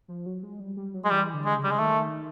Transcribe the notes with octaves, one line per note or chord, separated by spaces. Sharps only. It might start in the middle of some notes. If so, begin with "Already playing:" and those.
F3
F#3
G#3
G3
G3
F#3
G#3
E3 G3
D3
G#3
C#3
G3
G#3
D#3 A3